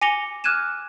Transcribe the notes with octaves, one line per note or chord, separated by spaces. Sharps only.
G#5 D6 A#6 C#7 F7 G7
D6 F6 F#6 G#6 D#7 E7